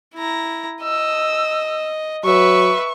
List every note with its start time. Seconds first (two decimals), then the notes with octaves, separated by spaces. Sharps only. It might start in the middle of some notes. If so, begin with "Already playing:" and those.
0.15 E4 A#5
0.83 D#5 E6
2.25 F#3 B4 E5 C#6